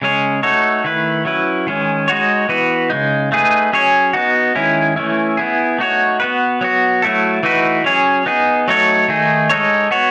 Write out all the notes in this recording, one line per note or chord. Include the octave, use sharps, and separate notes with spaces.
C#3 G#3 C#4 G#4 C#5
A3 D#4 F#4 A4 C#5
D#3 A3 E4 B4
F#3 C#4 E4 B4
D#3 G#3 C#4
G#3 D#4 F#4 C#5
E3 B3 F#4 B4
C#3 G#3 D#4
A3 D#4 G#4 B4
F#3 C#4 G#4 C#5
B3 D#4 F#4
D#3 G#3 C#4 E4
E3 A3 C#4 E4
B3 E4 G#4
A3 D#4 F#4 C#5
B3 F#4 B4
F#3 B3 F#4
F#3 A3 E4 A4
E3 A3 D#4 F#4 B4
F#3 C#4 G#4 C#5
B3 D#4 G#4
F#3 A3 D#4 A4 C#5
D#3 A3 D#4 G#4
G#3 D#4 A4 C#5
B3 F#4 C#5